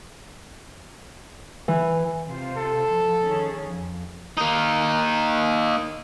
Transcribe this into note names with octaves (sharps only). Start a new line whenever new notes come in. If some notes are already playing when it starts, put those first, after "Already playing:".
E3
C3 F4 C5
A4
F3
D#3 C#4 G#4
F2
A#3 D#4